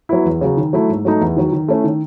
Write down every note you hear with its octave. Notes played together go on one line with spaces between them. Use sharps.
F#3 B3 E4
E2
C#3 F#3
D#3
F#3 A3 E4
G#2
F#3 A3 D#4
E2
D#3 F#3
D#3
A3 C#4 E4
D#3